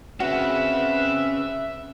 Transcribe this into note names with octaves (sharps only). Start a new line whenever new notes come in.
C4 C#4 F#4 G#4 B4 E5